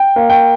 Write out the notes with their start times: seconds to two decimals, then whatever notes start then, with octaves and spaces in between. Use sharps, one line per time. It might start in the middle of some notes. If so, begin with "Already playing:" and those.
Already playing: G5
0.16 A#3
0.30 G5